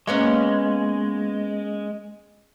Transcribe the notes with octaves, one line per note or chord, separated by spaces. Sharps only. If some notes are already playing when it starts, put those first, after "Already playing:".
G#3 A#3 B3 C#4